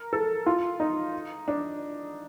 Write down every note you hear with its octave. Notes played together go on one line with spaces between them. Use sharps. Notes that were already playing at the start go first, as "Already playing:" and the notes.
Already playing: A#4
A4
F4
D#4
D4